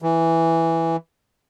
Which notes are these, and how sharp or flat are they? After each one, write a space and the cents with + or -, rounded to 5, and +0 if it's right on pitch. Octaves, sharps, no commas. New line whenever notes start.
E3 +0